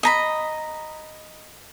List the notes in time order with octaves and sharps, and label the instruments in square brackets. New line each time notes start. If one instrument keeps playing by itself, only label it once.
[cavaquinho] D#5 A#5 B5